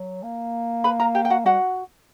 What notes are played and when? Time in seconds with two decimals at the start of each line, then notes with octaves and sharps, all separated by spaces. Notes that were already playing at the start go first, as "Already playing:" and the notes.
Already playing: F#3
0.23 A#3
0.84 B4 B5
1.00 A#4 A#5
1.15 G4 G5
1.25 G5
1.30 F#4 F#5
1.45 G3 F#4 F#5